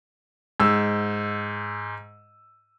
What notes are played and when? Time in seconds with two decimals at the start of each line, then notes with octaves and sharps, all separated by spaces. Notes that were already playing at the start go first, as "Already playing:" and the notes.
0.60 G#2 E6